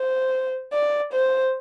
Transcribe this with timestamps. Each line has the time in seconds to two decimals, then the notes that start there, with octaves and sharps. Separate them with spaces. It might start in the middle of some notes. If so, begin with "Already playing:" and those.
Already playing: C5
0.72 D5
1.13 C5